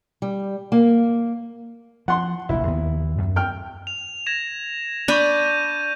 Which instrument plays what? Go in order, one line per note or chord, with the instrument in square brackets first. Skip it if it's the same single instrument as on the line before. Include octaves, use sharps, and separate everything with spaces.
[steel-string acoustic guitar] G3
A#3
[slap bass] F3 [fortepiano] F#5 C6
[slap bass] F1 A#1 [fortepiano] E4
[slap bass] D#2 D#3 B3
F#2
[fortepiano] G5 F6
[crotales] F7
G#6 A#6 E7
[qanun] D4 B5 [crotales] C#6 G6 D#7